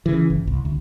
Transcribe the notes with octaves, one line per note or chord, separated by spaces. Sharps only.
C#3 E3
G1
C2
D2